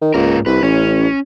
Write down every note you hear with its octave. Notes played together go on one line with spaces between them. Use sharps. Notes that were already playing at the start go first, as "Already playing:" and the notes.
D#3
C#2 G#2 A#3 A#4
C2 B4
A1 C#4